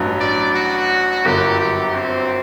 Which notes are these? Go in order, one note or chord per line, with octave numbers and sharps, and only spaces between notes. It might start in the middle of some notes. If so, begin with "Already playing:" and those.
Already playing: A1 G2 F#3
D5
F#4
G1 F#2 F#3 A#3 G4
G4
C4